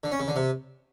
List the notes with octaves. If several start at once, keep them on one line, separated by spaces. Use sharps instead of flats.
D3
C#4
C#3
D3
C3